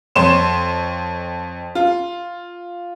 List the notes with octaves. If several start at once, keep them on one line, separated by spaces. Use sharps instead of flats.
F2 C#5 C6 E7
F4